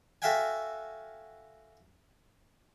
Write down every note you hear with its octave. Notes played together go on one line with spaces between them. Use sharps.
F#4 A4 E5 F5 G5 G#5